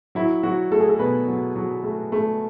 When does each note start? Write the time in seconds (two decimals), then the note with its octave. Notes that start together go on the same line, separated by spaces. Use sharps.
0.15 F#3 E4
0.43 F#3 F#4
0.71 A3 A4
0.80 G#4
0.89 A4
0.99 B2 B4
1.28 F#3
1.56 F#3
1.84 A3
2.12 A3